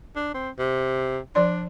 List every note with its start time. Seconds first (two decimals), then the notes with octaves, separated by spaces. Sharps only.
0.16 D4
0.35 C4
0.59 C3
1.35 F3 D4 D5 C6